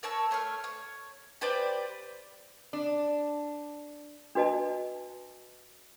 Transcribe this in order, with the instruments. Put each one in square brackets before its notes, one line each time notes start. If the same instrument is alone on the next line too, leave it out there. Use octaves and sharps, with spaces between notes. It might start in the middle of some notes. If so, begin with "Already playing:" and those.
[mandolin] A#4 C#5 A5 E6
A3 C#5 C6 F6
C#5
G4 B4 C5 D5
[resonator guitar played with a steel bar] D4
[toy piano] D4 F#4 B4 D#5 A5